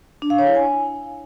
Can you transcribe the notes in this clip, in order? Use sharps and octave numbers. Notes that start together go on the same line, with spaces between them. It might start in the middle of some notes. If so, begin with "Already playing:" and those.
D4
F5
C#5
E4
G#5